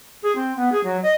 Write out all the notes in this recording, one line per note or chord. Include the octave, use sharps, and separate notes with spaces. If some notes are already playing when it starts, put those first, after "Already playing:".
G#4
C4
B3
G#4
F#3
D#5